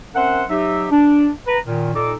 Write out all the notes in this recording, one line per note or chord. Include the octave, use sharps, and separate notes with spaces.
C4 C#4 A#4 C5 E5 F#5
F#3 D#4 G4 E5
D4
B4 A#5
A#2 D#3
A#2 D#4 A4 D6